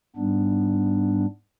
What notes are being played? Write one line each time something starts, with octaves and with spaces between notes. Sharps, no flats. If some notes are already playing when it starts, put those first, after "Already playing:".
G#2 G3 B3 D4